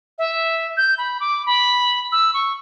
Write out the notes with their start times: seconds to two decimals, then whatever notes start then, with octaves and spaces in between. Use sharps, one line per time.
0.18 E5
0.77 G6
0.98 B5
1.20 D6
1.46 B5
2.12 E6
2.34 C#6